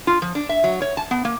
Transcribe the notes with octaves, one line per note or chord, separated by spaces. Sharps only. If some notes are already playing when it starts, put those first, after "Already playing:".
F4
F3
D4
E5
F#3
C#5
A5
B3
A#3